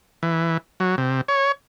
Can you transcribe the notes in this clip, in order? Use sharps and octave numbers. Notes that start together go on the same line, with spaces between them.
E3
F#3
C3
C#5